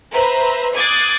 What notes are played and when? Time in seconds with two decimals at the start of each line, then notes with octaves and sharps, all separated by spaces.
0.12 B4 C5 E5 A#5
0.76 D6 D#6 F#6 G#6 A6 C7